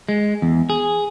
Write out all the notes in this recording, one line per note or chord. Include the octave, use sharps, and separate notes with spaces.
G#3
E2
G#4